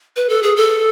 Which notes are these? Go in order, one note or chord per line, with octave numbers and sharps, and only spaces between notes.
B4
A4
G#4
A4